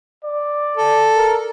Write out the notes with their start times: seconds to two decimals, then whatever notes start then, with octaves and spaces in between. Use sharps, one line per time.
0.24 D5
0.77 A4
1.16 A#4